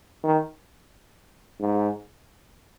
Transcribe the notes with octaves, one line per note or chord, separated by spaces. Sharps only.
D#3
G#2